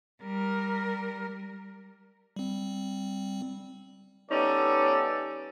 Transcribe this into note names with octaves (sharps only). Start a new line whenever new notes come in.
G3 A#4
G3 C4
G3 B3 C#4 D#4 A4 D5